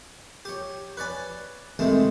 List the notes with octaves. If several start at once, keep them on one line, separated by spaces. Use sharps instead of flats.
G4 C#5
B4 C#5 D5 G#5
C3 D#3 E3 G#3 A3 C4